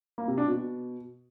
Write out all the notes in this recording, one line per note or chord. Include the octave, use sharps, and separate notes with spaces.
A#3
C3
D4
B2